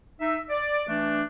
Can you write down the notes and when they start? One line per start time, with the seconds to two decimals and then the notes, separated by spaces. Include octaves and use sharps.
0.21 D#4 E5
0.49 D5
0.89 E3 A3 D4